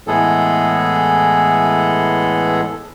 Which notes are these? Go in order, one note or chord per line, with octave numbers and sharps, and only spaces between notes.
A2 E3 G#3 B3 G#4 A4